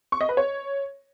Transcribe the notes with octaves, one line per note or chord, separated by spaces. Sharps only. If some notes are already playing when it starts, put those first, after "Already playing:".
C#6
D#5
B4
C#5